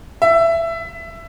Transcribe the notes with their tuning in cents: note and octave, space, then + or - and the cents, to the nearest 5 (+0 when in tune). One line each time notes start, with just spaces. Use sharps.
E5 +15